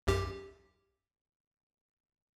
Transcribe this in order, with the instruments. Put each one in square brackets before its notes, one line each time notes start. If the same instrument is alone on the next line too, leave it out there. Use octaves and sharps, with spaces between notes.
[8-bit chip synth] B1 F#2 G4